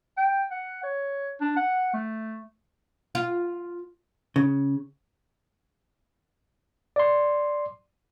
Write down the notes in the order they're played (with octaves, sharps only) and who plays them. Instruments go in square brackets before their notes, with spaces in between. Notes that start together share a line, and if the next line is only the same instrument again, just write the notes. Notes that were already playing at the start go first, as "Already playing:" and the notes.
[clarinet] G5
F#5
C#5
D4
F#5
A3
[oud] F4
[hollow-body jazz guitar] C#3
[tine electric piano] D5 C6